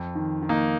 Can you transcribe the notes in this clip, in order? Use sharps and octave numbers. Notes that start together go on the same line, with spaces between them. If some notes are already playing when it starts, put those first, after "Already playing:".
Already playing: F2
D#3
D#3
A#3 D#4